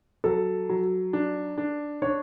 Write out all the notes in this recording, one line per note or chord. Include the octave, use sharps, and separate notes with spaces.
F#3 A4
F#3
D4
D4
D4 C#5